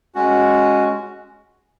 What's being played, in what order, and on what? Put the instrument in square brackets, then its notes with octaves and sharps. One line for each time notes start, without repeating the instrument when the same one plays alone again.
[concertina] G#3 C#4 F#4